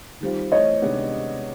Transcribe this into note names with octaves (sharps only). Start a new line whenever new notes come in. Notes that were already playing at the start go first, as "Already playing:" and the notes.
D#3 G3 C4 F4
E3 A3 C4 E4 C#5 D#5
C3 D#3 G#3 B3 D4